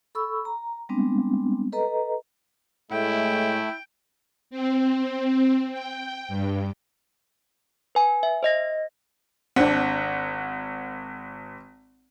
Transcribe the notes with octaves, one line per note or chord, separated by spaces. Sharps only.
A4 B5 C#6 E6
A#5
G3 G#3 B3 C4 D4
A4 B4 D#5 A#5
A2 G#3 A3 E4 G5
C4
G5
G2
B4 G#5
E5
C5 D#5 A#6
G#1 C4 D4 F#5